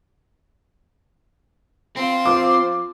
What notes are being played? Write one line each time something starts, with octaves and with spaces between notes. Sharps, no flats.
C4 F4 C6
F3 D6